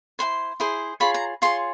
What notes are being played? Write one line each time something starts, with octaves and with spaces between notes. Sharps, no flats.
E4 G#4 C5 C6
E4 G#4 C5
F4 G#4 C#5 B5
A#5
F4 G#4 C#5 C6